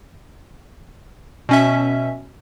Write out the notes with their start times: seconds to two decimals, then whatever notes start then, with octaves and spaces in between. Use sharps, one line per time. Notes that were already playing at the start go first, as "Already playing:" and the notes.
1.49 B2 C#4 E5